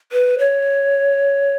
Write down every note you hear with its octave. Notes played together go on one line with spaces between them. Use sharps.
B4
C#5